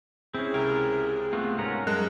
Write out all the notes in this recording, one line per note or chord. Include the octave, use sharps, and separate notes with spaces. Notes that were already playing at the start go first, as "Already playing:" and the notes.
C4 C#4 E4 G#4
C#2 C3 A#4
A3 B3 C4 F4
G#2 C#4 F4 A#4 F#5 A#5
F#2 G3 G#3 A#4 A5 F#6